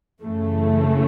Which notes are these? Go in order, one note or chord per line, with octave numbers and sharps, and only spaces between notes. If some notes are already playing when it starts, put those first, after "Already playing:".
F#2 C#3 E3 A3